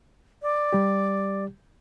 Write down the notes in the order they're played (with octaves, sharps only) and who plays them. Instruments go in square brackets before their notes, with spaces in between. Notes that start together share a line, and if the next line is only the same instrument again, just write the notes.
[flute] D5
[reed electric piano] G3 G4